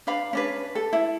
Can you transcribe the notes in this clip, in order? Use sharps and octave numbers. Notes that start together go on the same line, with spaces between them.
D4 B4 F5 B5
C#4 D4 B4
A4
E4